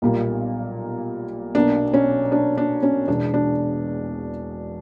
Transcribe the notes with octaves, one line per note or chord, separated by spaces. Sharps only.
B1 A#2 G3 A#3
B1 B2 A#3 D4
C#4
D4
D4
C#4
E1 E2 B2 D4
D4